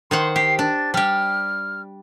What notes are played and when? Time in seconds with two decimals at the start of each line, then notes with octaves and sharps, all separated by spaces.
0.11 D#3 C5 F#5 C6
0.36 G4 C7
0.59 D4 A6
0.94 G3 G4 F6